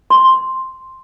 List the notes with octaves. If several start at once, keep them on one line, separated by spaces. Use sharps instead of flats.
C6